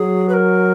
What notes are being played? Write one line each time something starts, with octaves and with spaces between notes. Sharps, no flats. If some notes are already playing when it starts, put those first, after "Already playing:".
Already playing: F#3 G#4
B4
A#4